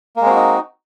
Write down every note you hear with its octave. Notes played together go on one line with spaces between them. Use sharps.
G#3 A#3 C4 D#4 F#4